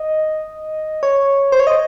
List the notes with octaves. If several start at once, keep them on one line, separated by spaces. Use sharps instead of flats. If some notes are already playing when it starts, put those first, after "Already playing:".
Already playing: D#5
C#5
C5
C#5
D#5